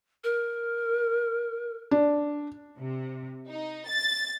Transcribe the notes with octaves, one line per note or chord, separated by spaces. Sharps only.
A#4
D4
C3
D#4
A6